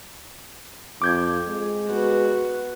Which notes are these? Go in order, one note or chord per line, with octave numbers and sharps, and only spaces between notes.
F2 D6 G6 G#6
G#3
B3 F#4